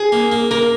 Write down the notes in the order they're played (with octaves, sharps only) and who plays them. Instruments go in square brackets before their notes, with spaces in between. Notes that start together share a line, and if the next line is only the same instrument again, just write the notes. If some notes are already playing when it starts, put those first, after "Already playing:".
Already playing: [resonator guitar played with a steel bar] G#4
[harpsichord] A#3
A#3
[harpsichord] A#3 [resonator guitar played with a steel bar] A#4